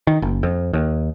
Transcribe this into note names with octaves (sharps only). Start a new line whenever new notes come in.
D#3
F#1
F2
D#2